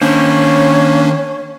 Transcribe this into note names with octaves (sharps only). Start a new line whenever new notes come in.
D#3 A#3 C#4 D4 C5 C#5